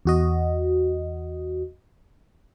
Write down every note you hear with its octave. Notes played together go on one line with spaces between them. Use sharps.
E2 F#4 D#5